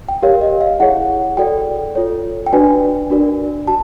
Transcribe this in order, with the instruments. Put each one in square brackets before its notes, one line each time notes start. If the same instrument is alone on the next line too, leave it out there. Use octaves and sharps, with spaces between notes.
[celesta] G5
G4 A#4 C#5 F5
D#5
F5
E4 G#4 C#5 F#5
F#4 A4 D5 G5
F4 A4 C#5
G5
D4 F#4 B4 D5 G#5
D4 F#4 A#4 D5
F#4 A5